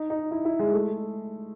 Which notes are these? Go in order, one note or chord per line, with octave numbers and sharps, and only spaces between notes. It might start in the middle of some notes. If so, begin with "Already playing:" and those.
Already playing: D#4
D#4
E4
E4
G#3
A3